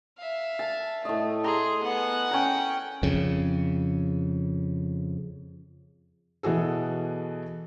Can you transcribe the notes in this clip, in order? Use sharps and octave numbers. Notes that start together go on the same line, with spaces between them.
E5 F5
A5
A2 A3 D#5
G#4 A#5 C6
B3 F#5 G#5
C#4 G5 A#5
F2 C#3
B2 E3 F#4 G#4 A4